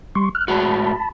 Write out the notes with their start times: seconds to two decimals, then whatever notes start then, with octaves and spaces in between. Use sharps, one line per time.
0.15 G3 C6 C#6
0.35 F6 F#6
0.48 A2 G#3 F#4 A5 B5